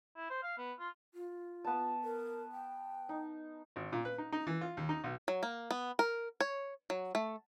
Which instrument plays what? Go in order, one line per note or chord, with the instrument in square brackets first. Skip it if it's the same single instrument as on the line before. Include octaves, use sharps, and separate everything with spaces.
[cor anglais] E4
C5
F5
B3
F4
[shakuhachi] F4
[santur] B3 A5
[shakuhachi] A#4
G5
[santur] D#4
[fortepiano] G#1
A#2
B4
D#4
D#4
E3
F4
D#2
D#4
B1
[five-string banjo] F#3
A#3
B3
A#4
C#5
F#3
A3